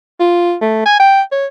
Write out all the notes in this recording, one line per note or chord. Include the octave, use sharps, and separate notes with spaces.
F4
A3
G#5
G5
C#5